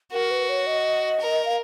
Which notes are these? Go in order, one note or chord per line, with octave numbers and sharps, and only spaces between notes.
F#4 A#4
B4
C#5
D#5
A#4
F5